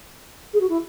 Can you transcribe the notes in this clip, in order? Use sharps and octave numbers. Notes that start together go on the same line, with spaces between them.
G#4
F#4
E4